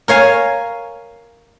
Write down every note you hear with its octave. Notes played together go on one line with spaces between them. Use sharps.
A#4 C#5 F5 G#5